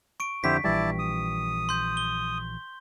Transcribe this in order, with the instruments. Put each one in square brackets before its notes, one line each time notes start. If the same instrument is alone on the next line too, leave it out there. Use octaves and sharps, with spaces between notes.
[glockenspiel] C#6 D7
[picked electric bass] F2 D3 [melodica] E4 G4 C5 [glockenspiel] B6
[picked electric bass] A#1 E3 G3 [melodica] E4 D5 A5
[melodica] D#6
[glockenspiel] C6 G6
G7